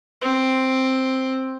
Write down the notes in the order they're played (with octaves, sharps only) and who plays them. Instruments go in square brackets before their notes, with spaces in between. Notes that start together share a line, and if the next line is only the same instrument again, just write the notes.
[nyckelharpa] C4